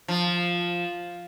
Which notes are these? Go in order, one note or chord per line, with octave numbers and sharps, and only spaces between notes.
F3